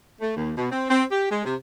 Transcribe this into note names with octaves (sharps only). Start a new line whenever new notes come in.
A3
D#2
B2
C4
C4
G4
G#3
C3